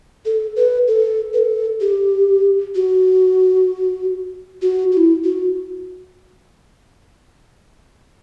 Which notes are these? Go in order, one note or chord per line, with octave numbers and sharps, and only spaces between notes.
A4
B4
A4
B4
A4
G4
F#4
F#4
F#4
E4
F#4